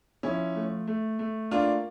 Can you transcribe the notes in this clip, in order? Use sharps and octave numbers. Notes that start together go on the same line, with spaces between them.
F3 C#4 E4
A3
A3
A3
A#3 D4 F4